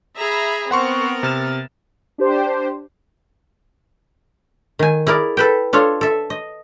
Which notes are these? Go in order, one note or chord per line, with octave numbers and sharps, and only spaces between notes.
G#4 E5 A#5 B5
B3 C4 A#4 F#5 C6 C#6
C3 F6 A6 E7
D4 G4 C5
D#3 G#5
E4 G#4 A#4 D5
A4 B4 G5
D4 F4 A4 C#5
A4 E5
D#5